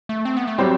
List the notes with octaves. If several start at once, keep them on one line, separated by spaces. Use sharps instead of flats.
A3
C4
B3
A3
F#3 G3 C4 G4 C5